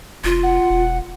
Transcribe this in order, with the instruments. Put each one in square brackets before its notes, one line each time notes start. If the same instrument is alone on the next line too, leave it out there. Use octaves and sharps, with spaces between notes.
[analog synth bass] F1 [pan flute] F4
[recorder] F#5
[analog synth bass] E1